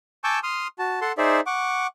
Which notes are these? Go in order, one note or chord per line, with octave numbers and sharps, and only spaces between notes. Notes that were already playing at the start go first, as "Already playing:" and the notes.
G#5 A5 C#6 D6 E6 G6
C6 D#6 F6
F#4 A5
A4 F#5 A5 C6
D#4 G#4 C5 D5 E5
F#5 C#6 D6